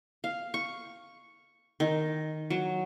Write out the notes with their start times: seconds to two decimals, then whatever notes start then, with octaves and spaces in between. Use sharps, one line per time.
0.24 F5
0.54 C#6
1.80 D#3
2.50 F#3